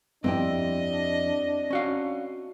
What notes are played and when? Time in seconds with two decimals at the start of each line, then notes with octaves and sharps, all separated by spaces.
0.24 F2 C4 D4 E4 G4 D#5
1.70 C#4 F#4 F5